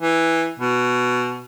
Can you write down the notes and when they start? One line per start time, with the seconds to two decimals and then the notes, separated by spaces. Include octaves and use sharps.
0.01 E3
0.59 B2